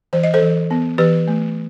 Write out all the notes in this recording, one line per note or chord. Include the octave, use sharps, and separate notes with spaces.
E3 C5
D#5
A4 C5
E3
B3
E3 G4 B4
A3